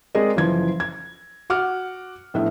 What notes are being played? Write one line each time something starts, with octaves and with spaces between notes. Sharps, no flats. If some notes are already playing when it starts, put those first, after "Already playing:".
G#3 C4 G#4 A#4 D5 D#5
F#1 E3 F3 C5 G#6
G#6
F#4 F#5 D6 F6
A#1 A2 B3 B4 E5